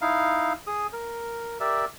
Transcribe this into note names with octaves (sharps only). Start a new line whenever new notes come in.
D#4 E4 F5
G#4 D#6
A#4
G4 A#4 D5 E5